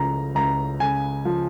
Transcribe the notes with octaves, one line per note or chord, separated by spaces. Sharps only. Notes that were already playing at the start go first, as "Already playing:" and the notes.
Already playing: C#2 C#3 F3 A#5
C#2 A#5
C#3 G#5
F3